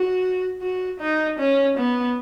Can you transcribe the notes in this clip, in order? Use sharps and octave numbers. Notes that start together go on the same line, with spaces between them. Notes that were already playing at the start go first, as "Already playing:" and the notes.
Already playing: F#4
F#4
D#4
C#4
B3